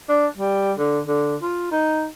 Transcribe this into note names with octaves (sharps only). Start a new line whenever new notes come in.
D4
G3
D3
D3
F4
D#4